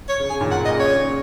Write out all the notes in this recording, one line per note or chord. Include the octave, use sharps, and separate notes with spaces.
C#5
C#3
C#3 G#5
A#2 D#3
A#2 F#5
C#3
D#5
A#2
C#5
C#3